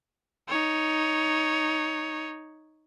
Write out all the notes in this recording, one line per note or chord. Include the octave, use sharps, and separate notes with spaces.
D#4 C#5